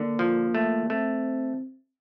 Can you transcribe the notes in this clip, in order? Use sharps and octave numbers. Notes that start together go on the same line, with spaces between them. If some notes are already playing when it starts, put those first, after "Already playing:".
Already playing: D3 A#3
F3
A3
A3 C4